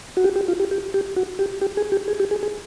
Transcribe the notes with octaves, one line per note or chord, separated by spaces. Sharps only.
F#4
G4
G4
F4
G4
G4
G4
F#4
G4
G4
G#4
G4
G#4
G4
G#4
G#4